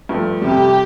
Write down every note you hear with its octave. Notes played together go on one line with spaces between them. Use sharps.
G2 F3 A3
F2 C3 G3 G4